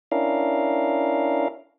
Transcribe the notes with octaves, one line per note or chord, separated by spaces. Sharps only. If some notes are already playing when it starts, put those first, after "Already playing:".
C#4 D4 E4 A#4 F5